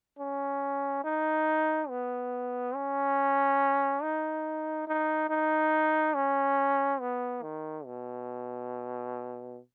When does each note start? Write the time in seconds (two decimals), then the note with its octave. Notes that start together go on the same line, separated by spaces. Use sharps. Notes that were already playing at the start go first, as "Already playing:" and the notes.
0.19 C#4
1.04 D#4
1.89 B3
2.75 C#4
4.02 D#4
4.88 D#4
5.29 D#4
6.15 C#4
7.01 B3
7.43 D#3
7.86 B2